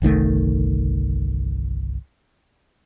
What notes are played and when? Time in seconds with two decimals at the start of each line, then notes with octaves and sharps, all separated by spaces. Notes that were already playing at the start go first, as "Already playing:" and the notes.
0.02 G1 C2 D#3 A3